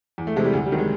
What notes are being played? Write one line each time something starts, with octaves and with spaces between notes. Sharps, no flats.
E2
A3
C3 E3 G#3
G3
D2
G3
C3 D#3 F#3
G#3